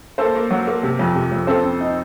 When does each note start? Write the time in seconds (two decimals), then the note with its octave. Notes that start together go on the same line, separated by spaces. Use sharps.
0.18 A#3 A4 C5
0.35 A#3
0.51 F#3
0.67 A#3
0.83 C3
0.99 F2
1.15 C3
1.32 F2
1.47 C4 A4 C5
1.64 C4
1.81 D#4